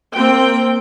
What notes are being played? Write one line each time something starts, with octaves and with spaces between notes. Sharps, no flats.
A#3 C4 G5